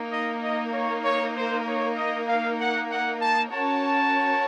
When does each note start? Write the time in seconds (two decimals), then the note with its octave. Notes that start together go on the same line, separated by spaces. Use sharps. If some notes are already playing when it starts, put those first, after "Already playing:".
Already playing: A#3 D#4 A#4
0.12 D#5
0.43 D#5
0.73 C#5
1.05 C#5
1.35 C5
1.66 C#5
1.98 D#5
2.28 F5
2.59 F#5
2.90 F#5
3.21 A5
3.52 C#4 F#4 A#4 C#5 A5